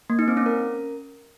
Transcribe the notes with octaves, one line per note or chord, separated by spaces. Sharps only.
A#3
D#4
C4
C#4
A#4